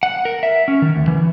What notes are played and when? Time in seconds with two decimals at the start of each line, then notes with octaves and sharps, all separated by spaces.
0.03 F#5
0.25 A#4
0.43 E5
0.68 C#4
0.82 D#3
0.96 D2
1.08 E3